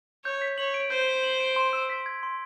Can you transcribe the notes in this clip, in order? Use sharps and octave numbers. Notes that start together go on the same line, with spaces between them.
C#5 G6
B6
C#5 F#7
D7
C5 G6
B6
F#7
D7
C6
E6
B6
G#6
C6